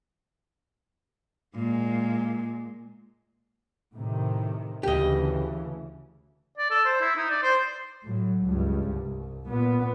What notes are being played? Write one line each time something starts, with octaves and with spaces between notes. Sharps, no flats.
A#2 G#3
A2 C3 D#3
D2 C#3 E3 G4 D#5
D5
A4
C5
E4
D#4
D5
C5
A2 F#3
C#2 G2
C2
A#2 B3